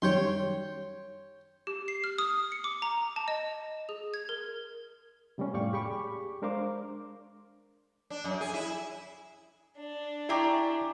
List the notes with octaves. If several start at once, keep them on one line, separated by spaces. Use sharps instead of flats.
F#2 D#3 G3 C#5 G5 C6
G4
C7
F6
D#6
C#7
D6
A#5
A5
D#5
G#4
G#6
A#4
C3 G3 A#3 C#4
F2 A2 D5 F5 G5 C#6
G4 G#4 B5 C#6 D6
G#3 D4 A#4 C5 F5 D6
D4
F#2
G#4
E4
D4
E4 G4 G#4 D5 A#5 C#6